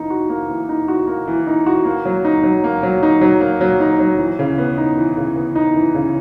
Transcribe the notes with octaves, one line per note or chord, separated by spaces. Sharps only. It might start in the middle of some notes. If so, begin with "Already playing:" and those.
Already playing: E3 A#3 D#4
F#4
A#3
E3
D#4
F#4
A#3
E3
D#4
F#4
A#3
F#3
D#4
F#3
A#3
F#3
D#4
F#3
A#3
F#3
D#4
F#3
E3
C#3
B3
D#4
E3
C#3
B3
D#4
E3
C#3